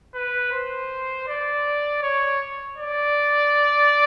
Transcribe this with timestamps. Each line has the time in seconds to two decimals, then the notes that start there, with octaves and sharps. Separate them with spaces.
0.14 B4
0.52 C5
1.28 D5
2.02 C#5
2.77 D5